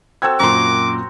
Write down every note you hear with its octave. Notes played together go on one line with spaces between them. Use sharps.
C4 F#4 A4 E6 G#6
F#2 A#2 A#5 C6 D6